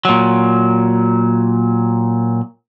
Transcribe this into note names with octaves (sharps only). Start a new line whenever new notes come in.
A#2 F#3